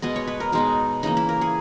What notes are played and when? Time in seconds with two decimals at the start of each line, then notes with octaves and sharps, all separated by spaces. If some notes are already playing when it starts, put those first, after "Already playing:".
0.02 B2 G#3 B3 D#5
0.16 C#5
0.28 B4
0.40 A#4
0.52 B2 G#3 B3 D#4
1.03 C#3 E3 A#3 D#4
1.17 E4
1.29 A#4
1.41 G#4